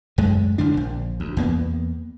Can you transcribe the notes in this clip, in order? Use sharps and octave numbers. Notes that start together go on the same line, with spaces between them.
F#1 F#2 G#3 A3
F#1 E2 D3 D4
A#1
D2
E2 A#3 B3